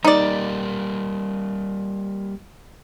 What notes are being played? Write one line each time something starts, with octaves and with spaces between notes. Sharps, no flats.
G3 A#3 D#4 D5